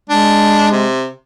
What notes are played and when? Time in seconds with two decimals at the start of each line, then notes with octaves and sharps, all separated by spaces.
0.09 G#3 D4
0.71 C3